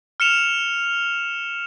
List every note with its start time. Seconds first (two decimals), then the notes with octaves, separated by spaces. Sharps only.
0.20 F6 C#7 E7 F7